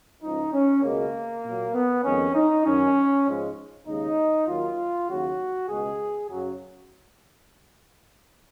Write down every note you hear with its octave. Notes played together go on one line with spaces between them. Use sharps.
C#2 C#3 F3 D#4
C#4
C#2 B2 G#3 A#3
A#2 F#3
B3
F2 D#3 G#3 C#4
D#4
F#2 D#3 F#3 C#4
G#2 F3 G#3
D#2 C#3 G#3 D#4
D#2 D#3 F#3 F4
D#2 C#3 F#3 F#4
C#2 B2 G#3 G#4
F#2 C#3 F#3